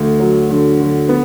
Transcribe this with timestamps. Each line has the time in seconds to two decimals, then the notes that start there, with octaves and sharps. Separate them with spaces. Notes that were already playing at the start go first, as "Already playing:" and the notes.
Already playing: D2
0.20 F#3
0.50 D3
0.80 D3
1.09 B3